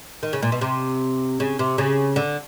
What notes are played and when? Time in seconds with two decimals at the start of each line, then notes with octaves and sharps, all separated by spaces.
0.23 D#3
0.33 C#3
0.42 A#2
0.52 B2
0.61 C3
1.40 C#3
1.59 C3
1.78 C#3
2.16 D3